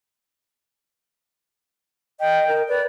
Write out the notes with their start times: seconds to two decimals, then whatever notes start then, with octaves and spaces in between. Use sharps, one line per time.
2.20 D#5 G5
2.48 A#4
2.68 B4 D5